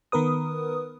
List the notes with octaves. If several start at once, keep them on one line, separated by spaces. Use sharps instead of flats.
D#3 B3 A#4 B4 D#6